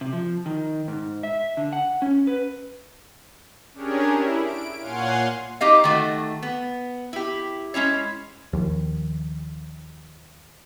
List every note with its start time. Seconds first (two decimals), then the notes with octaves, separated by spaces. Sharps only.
0.01 C3
0.13 F3
0.46 D#3
0.88 G#2
1.23 E5
1.57 D3
1.73 F#5
2.02 C#4
2.27 B4
3.74 C#4 D4 G4 G#4 A#4 C#5
4.08 E4
4.44 D7
4.80 A#2 C#5 F5 F#5 G#5 C6
5.61 D#4 G4 D#5 F5
5.84 D#3 A3 F#4
6.43 B3
7.13 E4 G4
7.74 G#3 C#4 E4 C#5
8.53 D#2 F3